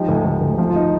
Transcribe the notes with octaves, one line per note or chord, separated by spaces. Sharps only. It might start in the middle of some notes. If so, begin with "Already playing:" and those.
Already playing: F3 D#4 G4
D2
D2
D2
F3
F4
D#4